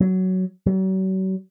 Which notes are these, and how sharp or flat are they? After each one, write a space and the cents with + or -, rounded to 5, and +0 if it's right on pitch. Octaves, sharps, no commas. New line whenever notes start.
F#3 +10
F#3 +40